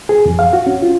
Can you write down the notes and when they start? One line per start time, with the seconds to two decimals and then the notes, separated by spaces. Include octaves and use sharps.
0.09 G#4
0.26 F2
0.39 F5
0.53 F#4
0.67 C#4
0.82 F4